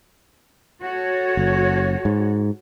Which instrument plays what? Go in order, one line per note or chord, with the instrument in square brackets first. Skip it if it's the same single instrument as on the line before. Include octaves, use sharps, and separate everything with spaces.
[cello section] F#4 A4 C#5
[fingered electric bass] F#1
G#2